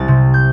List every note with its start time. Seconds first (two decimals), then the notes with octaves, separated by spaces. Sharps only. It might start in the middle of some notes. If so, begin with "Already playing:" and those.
Already playing: C2 G3 A6
0.08 C3
0.34 G6